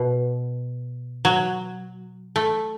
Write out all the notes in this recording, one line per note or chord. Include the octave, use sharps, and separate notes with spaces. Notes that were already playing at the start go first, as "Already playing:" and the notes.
Already playing: B2
F#3
A3